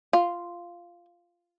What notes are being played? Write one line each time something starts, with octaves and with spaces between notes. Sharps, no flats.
F4